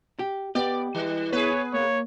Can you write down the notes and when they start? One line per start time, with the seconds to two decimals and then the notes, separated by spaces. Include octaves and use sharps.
0.19 G4
0.55 B3 G4 D5
0.94 E3 G3
1.33 B3 G#4 B4 C#5
1.73 A#3 C#5